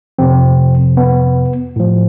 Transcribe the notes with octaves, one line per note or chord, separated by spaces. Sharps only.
F2 C3 F3 C4
B3
A2 F3